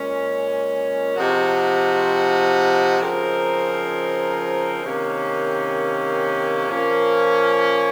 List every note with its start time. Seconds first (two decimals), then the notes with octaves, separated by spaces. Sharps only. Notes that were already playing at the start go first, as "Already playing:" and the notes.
Already playing: A#2 G#3 C#4
1.16 C3 F3 G#3 D#4 F#4
3.00 C#3 F3 C4 D#4 A#4
4.84 C3 D#3 A#3 C#4
6.68 A#2 F3 A#3 C#4